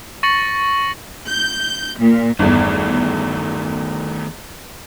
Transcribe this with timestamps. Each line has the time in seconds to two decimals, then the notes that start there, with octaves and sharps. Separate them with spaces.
0.23 C#6 A6 A#6 C#7 F#7
1.28 G6
1.99 A#2
2.39 G1 E2 D#3 A3